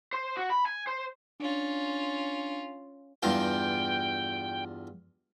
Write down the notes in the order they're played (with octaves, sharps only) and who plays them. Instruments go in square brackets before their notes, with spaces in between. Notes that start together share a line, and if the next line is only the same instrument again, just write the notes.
[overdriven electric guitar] C5
F#4
B5
G#5
C5
[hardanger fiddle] C#4 F4 [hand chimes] D4
[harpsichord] E2 G2 F4 [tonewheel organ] G5